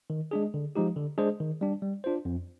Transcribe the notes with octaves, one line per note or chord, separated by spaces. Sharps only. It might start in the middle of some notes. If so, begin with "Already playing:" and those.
D#3
G#3 D4 G#4
D3
F3 G#3 D#4 G4
D3
G#3 D4 G#4 C5
D#3
G3 D4
G3
D4 F4 C5
F2